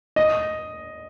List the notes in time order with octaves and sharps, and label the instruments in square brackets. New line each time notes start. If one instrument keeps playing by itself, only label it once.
[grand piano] D#5